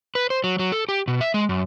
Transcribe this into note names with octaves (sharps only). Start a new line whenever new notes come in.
B4
C5
F#3
F#3
A4
G4
B2
E5
G#3
F#2